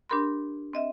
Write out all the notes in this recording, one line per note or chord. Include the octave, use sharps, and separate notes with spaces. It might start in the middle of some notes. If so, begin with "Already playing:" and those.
D4 G4 A#4 B5 C6
C4 D#5 E5